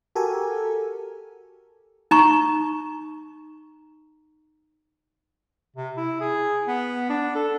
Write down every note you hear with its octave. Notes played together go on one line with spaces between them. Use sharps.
F#4 G4 A4 A#4 G#5
D#4 A#5 C#6
C3
E4
G#4
B3
D4
A4